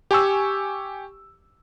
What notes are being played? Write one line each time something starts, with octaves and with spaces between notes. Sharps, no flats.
G4 G#5 C#6 E6